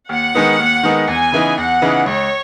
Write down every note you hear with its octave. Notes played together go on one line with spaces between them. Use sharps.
D#2 F#5
D#3 G#3 B3 D#4
D#2
D#3 G#3 B3 D#4
E2 G#5
C#3 E3 B3 D#4
E2 F#5
C#3 E3 B3 D#4
C#2 C#5